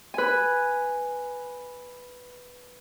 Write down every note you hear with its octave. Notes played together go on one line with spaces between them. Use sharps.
B4 G#5